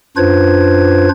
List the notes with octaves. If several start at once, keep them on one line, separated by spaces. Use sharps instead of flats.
F#2 D4 F4 B4 C5 G#6